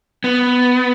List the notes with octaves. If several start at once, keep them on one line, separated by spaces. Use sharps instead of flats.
B3